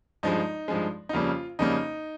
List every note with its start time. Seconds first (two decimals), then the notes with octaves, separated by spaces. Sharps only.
0.23 G2 F3 G#3 D#4
0.68 G2 F3 G#3
1.09 D#4
1.13 F2 C#3 G3 A#3 F4
1.59 F2 C#3 G3 A#3 D#4